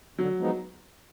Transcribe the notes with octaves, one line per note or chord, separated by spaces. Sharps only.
D3 F#3
F3 G#3 B3 D#4